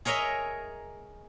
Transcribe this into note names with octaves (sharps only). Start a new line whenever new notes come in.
G#4 A#4 C#5 D#5 E5 A#5